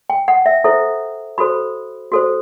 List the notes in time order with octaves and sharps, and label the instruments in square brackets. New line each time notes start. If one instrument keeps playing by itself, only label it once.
[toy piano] G5
F#5
E5
E4 A4 C5 E5
F#4 A4 C5 B5
F#4 A4 C5